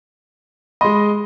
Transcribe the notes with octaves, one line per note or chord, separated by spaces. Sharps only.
G#3 D#5 B5 C6